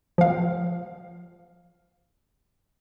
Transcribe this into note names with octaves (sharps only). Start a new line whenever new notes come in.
F3 F5